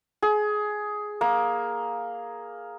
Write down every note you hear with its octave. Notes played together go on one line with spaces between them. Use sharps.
G#4
A#3